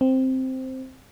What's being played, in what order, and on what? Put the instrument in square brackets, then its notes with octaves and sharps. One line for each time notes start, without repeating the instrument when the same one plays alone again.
[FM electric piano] C4